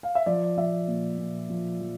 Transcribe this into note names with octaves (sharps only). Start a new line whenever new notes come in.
F5
E5
F3 D5
F3 E5
A#2
A#2
F3
F3